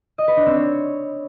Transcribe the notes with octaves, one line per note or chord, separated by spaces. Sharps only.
D#5
B4
D4
C4
C#5